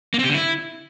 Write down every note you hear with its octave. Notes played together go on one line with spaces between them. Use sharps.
A#3
C4
G4
D3
E4